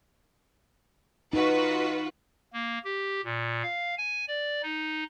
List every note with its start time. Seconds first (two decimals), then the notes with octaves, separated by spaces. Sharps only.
1.33 D#4 F4 F#4 B4
2.53 A#3
2.84 G4
3.25 A#2
3.63 F5
3.98 G#5
4.28 D5
4.63 D#4